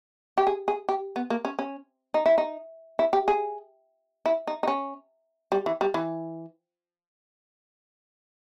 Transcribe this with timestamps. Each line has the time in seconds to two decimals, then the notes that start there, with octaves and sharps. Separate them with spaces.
0.38 G4
0.47 G#4
0.68 G#4
0.89 G4
1.16 B3
1.30 A#3
1.45 C#4
1.59 C#4
2.14 D#4
2.26 E4
2.38 D#4
2.99 E4
3.13 G4
3.28 G#4
4.26 E4
4.47 D#4
4.63 D#4
4.68 C#4
5.52 G3
5.66 E3
5.81 G3
5.94 E3